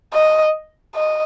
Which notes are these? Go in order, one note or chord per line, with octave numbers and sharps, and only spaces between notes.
D#5
D#5